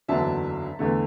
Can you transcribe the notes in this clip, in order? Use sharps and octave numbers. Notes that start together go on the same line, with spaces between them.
F#1 E2 D3 F#3 D4 E5 A5
E2 D3 A3